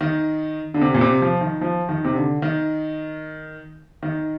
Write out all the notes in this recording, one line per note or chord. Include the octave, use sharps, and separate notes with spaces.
D#3
D3
C3
A#2
C3
F3
D#3
F3
D#3
C3
D3
D#3
D#3